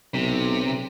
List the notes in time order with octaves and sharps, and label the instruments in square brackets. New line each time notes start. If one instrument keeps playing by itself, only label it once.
[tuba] B1 [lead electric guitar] C3